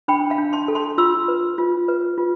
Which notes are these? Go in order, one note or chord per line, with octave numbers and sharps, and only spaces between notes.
D4 G5 B5
F5 A5
D4
A5 C6
A4
A5 C6
F4 C6 E6
B4
F4
B4
F4